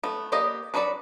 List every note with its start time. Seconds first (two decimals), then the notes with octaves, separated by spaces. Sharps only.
0.04 A3 B3
0.32 A#3 B3 G4 D5 D#5
0.74 D4 D#4 F#4 B4 D5